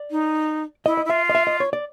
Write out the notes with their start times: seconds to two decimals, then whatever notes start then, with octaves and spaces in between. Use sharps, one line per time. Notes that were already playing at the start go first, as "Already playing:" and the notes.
Already playing: D5
0.11 D#4
0.85 E4 D#5
0.97 D#5
1.05 E4
1.10 F4 E5
1.30 D#5
1.35 E5
1.47 D#5
1.60 C#5
1.73 D5